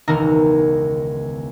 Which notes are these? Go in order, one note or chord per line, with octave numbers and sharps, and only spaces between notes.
E1 C#2 D#3 D#4 A#4 A#5